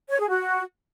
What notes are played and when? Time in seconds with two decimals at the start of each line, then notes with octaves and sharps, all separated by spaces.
0.10 C#5
0.19 G#4
0.28 F#4